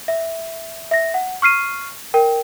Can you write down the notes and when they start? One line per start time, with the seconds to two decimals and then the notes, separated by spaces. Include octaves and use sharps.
0.08 E5
0.91 E5 A#6
1.14 F#5
1.42 C#6 F6 C7 D#7
2.14 A#4 G5